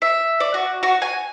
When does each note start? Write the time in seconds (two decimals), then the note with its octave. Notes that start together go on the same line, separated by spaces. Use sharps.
0.02 E5
0.40 D5
0.54 F#4
0.83 F#4
1.02 G#5